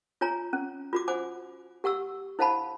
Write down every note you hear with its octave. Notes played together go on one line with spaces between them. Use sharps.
F4 C#5 G#5 A#5
C#4
F4 F#4 D6
C5 F#5 G#5 D6
G4 F#5 C#6 E6
E4 C5 F5 F#5 A5 B5